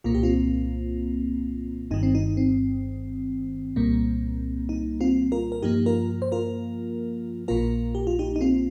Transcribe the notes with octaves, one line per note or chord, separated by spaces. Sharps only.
C2 A#2 A#3 F4
G4
C4 F4
G1 G2 D#3 D#4
C4
D#4
C4
C2 A#2 G3 A#3
D#4
C4 F4
F4 A#4
A#4
G2 F3 A#3 D#4 G4
F4 A#4
C5
F4 A#4
A#1 A#2 A#3 F4 A#4
G4
F4
D#4 G4
D#4
C4 F4